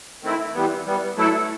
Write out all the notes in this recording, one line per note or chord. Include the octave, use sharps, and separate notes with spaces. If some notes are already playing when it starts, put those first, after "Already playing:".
D#3 A3 C4 E4
E3 G3 B3
E3 G3 B3
F#3 A3 E4 A4